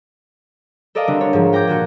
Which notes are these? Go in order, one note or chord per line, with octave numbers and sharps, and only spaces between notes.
A4 A#4 D5 D#5 F5 A#5
D3 G3 C4 D4
C#5
G#2 F3
G5 A#5 D6 G6 G#6
A#2 D3 F#4 A#6